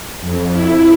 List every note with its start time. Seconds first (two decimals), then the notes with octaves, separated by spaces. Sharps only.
0.20 F2
0.52 E4